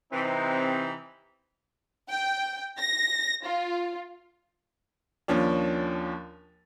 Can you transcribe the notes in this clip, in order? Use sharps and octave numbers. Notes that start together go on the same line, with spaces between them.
C3 E3 C4 D#4
G5
A#6
F4
D#2 F3 C#4 D4